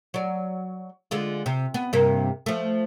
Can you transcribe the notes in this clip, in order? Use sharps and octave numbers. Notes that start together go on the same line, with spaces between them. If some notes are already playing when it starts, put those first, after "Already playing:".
F#3 D5
D3 G#3 F4
C3
B3
G2 C3 A#3
F3 A3